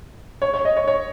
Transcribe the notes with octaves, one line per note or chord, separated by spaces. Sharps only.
C#5
C#5
D#5
C#5
C#5